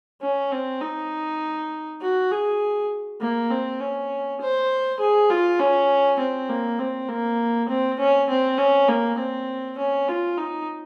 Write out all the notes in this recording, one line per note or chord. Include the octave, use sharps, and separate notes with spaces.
C#4
C4
D#4
F#4
G#4
A#3
C4
C#4
C5
G#4
F4
C#4
C4
A#3
C4
A#3
C4
C#4
C4
C#4
A#3
C4
C#4
F4
D#4